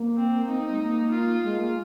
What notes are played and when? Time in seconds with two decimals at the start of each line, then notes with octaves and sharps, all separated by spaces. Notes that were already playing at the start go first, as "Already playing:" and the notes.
Already playing: A#3
0.17 C4
0.49 C4 D#4
0.70 G#3
0.80 A#3
1.11 F4
1.43 G#3
1.59 A#3